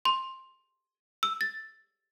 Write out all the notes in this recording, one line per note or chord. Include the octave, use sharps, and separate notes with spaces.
C6
E6
A6